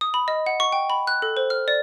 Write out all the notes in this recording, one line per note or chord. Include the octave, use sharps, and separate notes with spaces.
D#6
B5
D#5
F#5
C#6
G5
B5
F#6
A4
C5
F6
D5